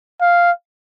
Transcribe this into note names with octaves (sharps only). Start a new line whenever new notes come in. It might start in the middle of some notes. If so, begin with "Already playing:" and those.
F5